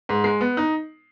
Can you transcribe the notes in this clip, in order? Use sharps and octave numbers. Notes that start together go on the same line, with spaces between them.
G#2
G#3
B3
D#4